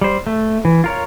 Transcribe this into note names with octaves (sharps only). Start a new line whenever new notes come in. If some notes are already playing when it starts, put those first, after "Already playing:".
G3 C5
A3
E3
F4 A#4 C#5